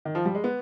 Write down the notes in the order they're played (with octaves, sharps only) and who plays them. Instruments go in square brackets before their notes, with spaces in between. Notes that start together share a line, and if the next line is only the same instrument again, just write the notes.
[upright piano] D#3
F3
G3
G#3
B3